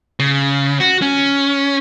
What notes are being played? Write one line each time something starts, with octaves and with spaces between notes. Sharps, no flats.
C#3
F#4
C#4